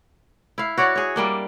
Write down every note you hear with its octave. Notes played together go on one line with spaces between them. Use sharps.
E4 F5
F#4 C#5 D5 F#5
G#4 C#5
G3 A#3 D4